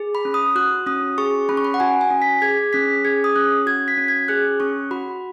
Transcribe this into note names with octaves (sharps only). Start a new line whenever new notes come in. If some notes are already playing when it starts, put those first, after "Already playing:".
Already playing: G#4
B5
C#4
D#6
F#4 F#6
C#4 D#6
G#4 C#6
C#4 B5
C#6
B5
F#5
F#4 G#5
G#5
C#4
B6
G#4 G#6
C#4 B6
G#4 G#6
D#6
C#4 F#6
F#4 G#6
B6
C#4
G#6
G#4 F#6
C#4 C#6
F#4 B5